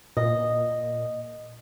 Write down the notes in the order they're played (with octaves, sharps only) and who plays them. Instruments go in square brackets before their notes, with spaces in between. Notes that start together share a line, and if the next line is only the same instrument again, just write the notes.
[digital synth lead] A#2 [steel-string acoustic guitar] D#5